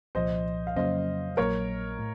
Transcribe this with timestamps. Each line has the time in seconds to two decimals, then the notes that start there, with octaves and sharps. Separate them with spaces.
0.15 C2 A#2 F3 C5 D#5
0.67 F5
0.76 F2 C#3 F#3 A#3 C#4 C5 D#5
1.37 A#1 A#2 F#3 A#3 A#4 C#5
1.99 A2